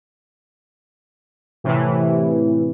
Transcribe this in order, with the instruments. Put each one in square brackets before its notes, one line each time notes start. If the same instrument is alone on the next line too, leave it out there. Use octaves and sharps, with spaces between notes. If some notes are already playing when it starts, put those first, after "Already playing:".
[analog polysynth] A2 C3 E3